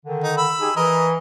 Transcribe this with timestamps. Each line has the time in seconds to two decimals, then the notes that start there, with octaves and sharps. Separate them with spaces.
0.05 D3 D#3
0.24 D#4
0.37 B5 E6
0.60 D#4 G4 G#4
0.76 E3 A#4 D#5